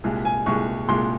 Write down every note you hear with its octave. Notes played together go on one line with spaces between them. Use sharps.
C2 A#2 G#3
G#5
C2 A#2 G#3 C#6
C2 A#2 G#3 C6